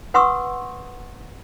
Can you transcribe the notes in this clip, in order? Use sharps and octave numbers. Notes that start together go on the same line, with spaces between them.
B4 F#5 C6 C#6 D#6 E6